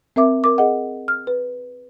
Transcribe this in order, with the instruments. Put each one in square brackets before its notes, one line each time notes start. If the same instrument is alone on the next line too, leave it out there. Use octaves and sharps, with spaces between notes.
[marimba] C4 A#4 E5 D6
A#4 D6
G#4 D#5 F#5
F6
B4